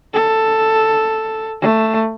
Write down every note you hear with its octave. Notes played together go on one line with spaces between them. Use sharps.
A4
A3